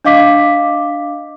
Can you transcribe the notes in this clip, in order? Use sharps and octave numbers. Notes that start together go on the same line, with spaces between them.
D4 D#5 F5 D6 B6